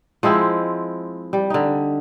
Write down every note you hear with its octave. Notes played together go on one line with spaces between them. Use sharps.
F3 G#3 C4 E4
G3
D3 D#4